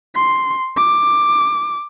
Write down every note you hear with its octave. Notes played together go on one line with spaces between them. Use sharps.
C6
D6